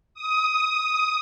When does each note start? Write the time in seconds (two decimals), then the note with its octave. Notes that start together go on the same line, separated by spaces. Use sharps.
0.14 D#6